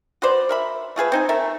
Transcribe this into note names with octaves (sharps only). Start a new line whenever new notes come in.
F#4 B4 C5 D5
A#4 E5 B5
A3 F4 G#4 B4
C4 D#4 G#5
A3 A4 A#4 E5